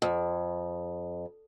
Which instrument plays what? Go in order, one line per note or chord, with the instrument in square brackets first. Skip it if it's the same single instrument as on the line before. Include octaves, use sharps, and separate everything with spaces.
[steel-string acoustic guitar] F2